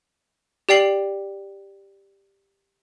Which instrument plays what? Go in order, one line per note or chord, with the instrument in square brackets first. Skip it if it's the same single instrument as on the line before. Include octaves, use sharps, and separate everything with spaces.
[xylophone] G4 D5 G5 C7 F#7